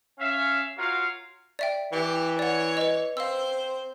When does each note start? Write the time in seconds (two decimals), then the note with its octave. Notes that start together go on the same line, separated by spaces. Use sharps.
0.19 C#4 E5 F5
0.78 F4 F#4 A#4 C#5 F5
1.59 D5 E5 G5
1.92 E3 G4
2.39 C#5 D5 F#5
2.77 B4 D#5
3.17 C4 C5 F5 E6